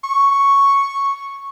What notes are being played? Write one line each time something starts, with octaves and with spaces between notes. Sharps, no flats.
C#6